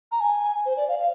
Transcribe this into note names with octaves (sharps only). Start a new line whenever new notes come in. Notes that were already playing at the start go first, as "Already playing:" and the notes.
A#5
G#5
C5
D5
F5
F5